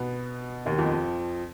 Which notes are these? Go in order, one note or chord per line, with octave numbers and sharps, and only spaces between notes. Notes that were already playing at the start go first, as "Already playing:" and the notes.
Already playing: B2 B3
D#2 D#3
F2 F3